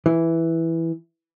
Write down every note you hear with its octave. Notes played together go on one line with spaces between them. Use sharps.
E3